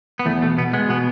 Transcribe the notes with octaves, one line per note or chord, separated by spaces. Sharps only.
B3
E2 A3
B2 A3
B2 B3
G#3 B3
B2 B3